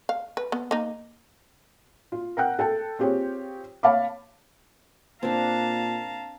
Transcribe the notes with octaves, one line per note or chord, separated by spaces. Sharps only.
F5
B4
B3
A#3 D#4
F4
A#4 F#5 G5 F#6
A4 G5 A5
C4 F4 G4 G#4 C#5
C#5 F5 A5 B5 D6
A#2 C4 D4 F5 A5 A#5